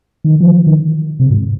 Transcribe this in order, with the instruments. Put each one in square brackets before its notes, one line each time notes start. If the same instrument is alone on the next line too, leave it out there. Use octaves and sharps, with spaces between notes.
[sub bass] D#3
F3
D#3
C3
G#2